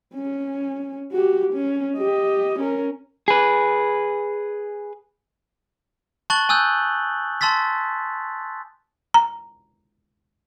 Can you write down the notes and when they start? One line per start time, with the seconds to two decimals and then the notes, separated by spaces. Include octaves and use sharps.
0.14 C#4
1.12 F#4 G4
1.53 C#4
1.97 G4 D#5
2.59 C#4 A#4
3.28 G#4 B4
6.30 A5 C#6 F#6 A6 F#7 G7
6.49 G#5 D#6 E6 F#6 G6
7.41 A5 C6 E6 A6 B6
9.14 A#5